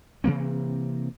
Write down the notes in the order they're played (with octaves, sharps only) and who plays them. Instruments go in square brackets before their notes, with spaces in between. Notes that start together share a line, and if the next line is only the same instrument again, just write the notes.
[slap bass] C3 E3 A#3 C4